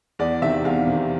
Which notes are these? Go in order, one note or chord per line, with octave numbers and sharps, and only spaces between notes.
E2 D5
C3 D#3 E5
E2 F5
C3 D#3